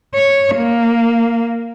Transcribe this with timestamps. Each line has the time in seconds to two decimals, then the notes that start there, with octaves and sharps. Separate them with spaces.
0.15 C#5
0.56 A#3